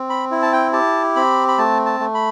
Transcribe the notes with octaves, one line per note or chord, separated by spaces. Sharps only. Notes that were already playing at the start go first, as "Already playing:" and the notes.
Already playing: C4
B5
E4
A5
G5
G4 A5
C4 B5
B5
A3 A5
A5
A3
B5